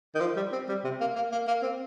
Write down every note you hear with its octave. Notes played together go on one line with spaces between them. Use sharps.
D#3
F3
G3
C4
G3
C3
A#3
A#3
A#3
A#3
C4